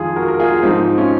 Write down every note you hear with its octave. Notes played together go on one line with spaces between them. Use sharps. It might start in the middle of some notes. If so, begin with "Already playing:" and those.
Already playing: F2 D#3 F4 G#4
F#4 A#4
A#4
F4 G#4
G#2 F3 C4 D#4
C#4 F4